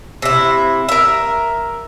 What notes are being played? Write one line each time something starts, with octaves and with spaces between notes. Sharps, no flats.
C3 E4
A#4 E5